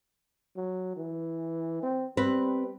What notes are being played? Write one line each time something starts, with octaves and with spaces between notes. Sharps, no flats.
F#3
E3
C4
G3 C4 B4